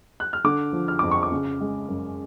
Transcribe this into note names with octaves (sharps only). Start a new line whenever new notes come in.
F#6
F6
D3 D6
F3
F6
F2 D6
C#6
D6
C#3
G#3
F#2